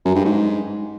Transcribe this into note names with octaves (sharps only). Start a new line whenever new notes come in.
F#2
G2
G#2